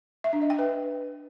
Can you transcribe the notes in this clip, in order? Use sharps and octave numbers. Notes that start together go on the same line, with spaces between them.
E5
D4
D#5
G5
B4